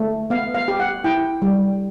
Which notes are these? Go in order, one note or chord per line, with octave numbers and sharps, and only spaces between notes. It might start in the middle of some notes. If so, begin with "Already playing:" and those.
Already playing: A3
B3 F5
F5
G4
F#5
E4 G5
G3